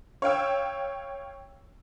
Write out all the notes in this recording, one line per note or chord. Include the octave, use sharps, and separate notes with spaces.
C#5 F5 G5 E6